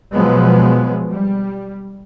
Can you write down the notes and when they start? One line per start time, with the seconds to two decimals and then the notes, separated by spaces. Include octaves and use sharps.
0.14 B2 F3 F#3 G#3 B3
1.10 G3